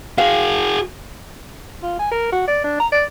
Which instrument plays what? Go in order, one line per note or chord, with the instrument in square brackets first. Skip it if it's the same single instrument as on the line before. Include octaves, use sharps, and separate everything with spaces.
[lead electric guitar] F#4 G#4 [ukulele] F5
[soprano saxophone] F4
G#5
A#4
F#4
D5
D4
A#5
D5